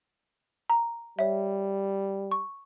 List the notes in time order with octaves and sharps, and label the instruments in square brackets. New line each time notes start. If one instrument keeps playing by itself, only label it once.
[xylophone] A#5
[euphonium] G3 [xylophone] C#5 E5
[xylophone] C#6